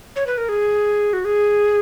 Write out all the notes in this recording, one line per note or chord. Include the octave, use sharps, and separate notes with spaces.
C#5
B4
A#4
G#4
F#4
G#4